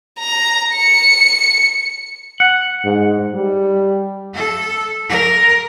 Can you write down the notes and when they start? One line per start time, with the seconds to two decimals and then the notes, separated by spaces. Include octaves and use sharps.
0.19 A#5
0.75 C#7
2.40 F#5
2.84 G#2
3.34 G3
4.34 A4
5.09 A#4